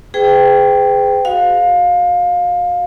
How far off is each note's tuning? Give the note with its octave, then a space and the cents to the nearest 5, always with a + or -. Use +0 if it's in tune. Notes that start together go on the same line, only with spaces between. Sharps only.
G#4 +0 B4 +45 G5 +0
F#4 +0 F5 +20